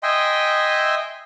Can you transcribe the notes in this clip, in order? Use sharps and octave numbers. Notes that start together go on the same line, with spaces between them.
D#5 E5 G5 G#5 C6